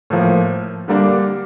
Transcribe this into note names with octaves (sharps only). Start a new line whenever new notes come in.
A2 F3 A#3
D3 G3 A#3 D4